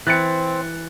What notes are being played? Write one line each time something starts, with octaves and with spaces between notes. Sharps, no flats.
E3 C4 F#6 A6 C#7